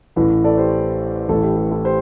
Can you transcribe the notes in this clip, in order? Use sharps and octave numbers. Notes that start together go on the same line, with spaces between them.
A1 A2 E3
A4 D5
G4 C5
A1 A2 E3 E4 A4
G4
G4
E4 A4
G4 C5